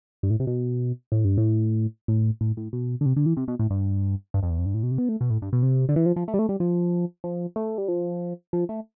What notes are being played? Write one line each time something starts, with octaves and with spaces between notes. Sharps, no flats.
G2
A2
C3
B2
A2
G2
A2
A2
A2
A2
B2
D3
C3
D3
E3
C3
B2
A2
G2
G2
F2
E2
F2
G2
A2
B2
C3
B3
A3
B2
A2
G2
B2
C3
D3
E3
F3
F3
A3
G3
A3
G3
F3
F3
A3
G3
F3
F3
A3